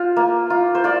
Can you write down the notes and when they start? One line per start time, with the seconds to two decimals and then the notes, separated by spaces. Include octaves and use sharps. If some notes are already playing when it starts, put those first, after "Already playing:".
Already playing: F4 C5
0.16 A#3
0.50 F4
0.75 C5
0.84 F4 D5